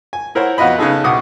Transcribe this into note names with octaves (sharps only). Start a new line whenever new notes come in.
G#5
E4 A#4 C5 C#5 F#5
F2 B3 F4 F#4 D#5 B5
C#3 B3 D#4 G#4 A4
C2 B2 F#4 D6 D#6